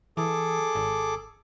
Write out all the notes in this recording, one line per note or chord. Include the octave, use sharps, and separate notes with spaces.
E3 G#4 A4 D6
G#1